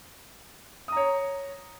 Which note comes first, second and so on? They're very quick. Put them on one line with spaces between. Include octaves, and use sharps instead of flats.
D#6 A#5 C#5